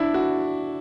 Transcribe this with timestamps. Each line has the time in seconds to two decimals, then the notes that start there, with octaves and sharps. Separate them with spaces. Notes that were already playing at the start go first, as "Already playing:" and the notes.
Already playing: D4 E4
0.14 F#4